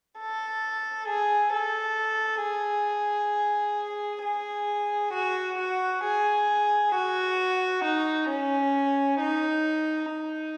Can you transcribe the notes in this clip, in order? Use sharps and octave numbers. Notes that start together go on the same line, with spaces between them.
A4
G#4
A4
G#4
G#4
F#4
F#4
G#4
F#4
D#4
C#4
D#4
D#4